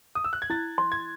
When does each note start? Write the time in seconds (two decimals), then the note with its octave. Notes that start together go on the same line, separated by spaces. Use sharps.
0.15 D#6
0.24 E6
0.33 F#6
0.42 G#6
0.50 E4 A6
0.78 C6
0.92 G#6